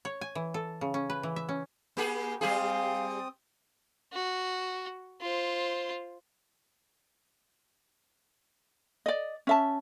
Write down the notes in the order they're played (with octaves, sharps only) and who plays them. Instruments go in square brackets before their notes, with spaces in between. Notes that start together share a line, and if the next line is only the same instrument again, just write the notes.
[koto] C#5
G#5
E3
A4
C#3
C#4
B4
E3
E5
C#4
[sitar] A#3 G4 G#4
[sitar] G3 G4 G#4 [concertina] C4 D#6 [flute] F5
[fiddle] F#4
F4 C5
[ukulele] D5 D#5
C#4 E5 A5